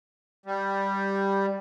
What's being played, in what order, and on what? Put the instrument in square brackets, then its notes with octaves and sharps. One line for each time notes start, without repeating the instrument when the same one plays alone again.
[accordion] G3